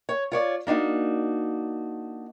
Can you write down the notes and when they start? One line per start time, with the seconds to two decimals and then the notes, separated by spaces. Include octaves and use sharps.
0.09 C#5
0.32 F4 C#5 D5
0.67 A#3 D4 D#4 F#4